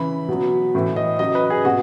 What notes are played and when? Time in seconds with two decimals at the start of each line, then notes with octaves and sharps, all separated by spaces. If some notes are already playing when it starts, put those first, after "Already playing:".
Already playing: C#3 E3 B5
0.28 B2 F#3
0.75 A2 E3
0.96 D#5
1.19 C#3 F#3 D#5
1.35 B4
1.50 G#4
1.65 B2 F#4